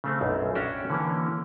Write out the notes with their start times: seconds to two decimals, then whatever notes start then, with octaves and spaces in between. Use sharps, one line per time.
0.04 C#3 A3 C4
0.21 B1 F#2
0.55 C#4 D4 F#4 C#5 E5 G5
0.90 D3 E3 A#3 C#4